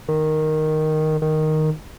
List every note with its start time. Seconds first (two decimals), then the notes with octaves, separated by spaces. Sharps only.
0.09 D#3
1.22 D#3